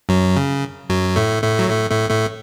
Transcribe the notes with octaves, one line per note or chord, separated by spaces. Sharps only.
F#2 F#3
C#3
F#2 F#3
A2 A3
A2 A3
F#3
A2 A3
A2 A3
A2 A3